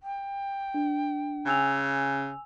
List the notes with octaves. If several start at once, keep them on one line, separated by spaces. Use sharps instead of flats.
G5
D4
C#3 G#5 E6 F7